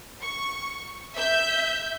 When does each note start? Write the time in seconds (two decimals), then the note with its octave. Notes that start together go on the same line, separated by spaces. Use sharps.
0.21 C#6
1.15 E5 G6